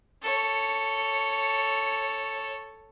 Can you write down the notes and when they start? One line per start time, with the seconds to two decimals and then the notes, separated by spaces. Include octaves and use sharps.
0.22 A4 C#5